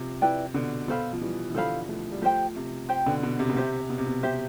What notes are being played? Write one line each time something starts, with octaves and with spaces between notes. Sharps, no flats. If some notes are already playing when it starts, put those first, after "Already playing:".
Already playing: C3 F3
E4 B4 D5 G5
B2 D3
B2 A4 C5 F5 B5
F3
E3 G3
E3
D3 F3 A4 C5 F5 B5
F3 A3
G3
F3 A3 G4 C5 G5
C3
G4 C5 G5
B2 D3
B2
C3
B2
C3 G4 C5 E5
B2
C3
B2
C3 G4 C5 E5